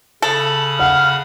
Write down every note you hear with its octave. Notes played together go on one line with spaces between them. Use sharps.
C#3 A4 B5 D#6
F5 F#5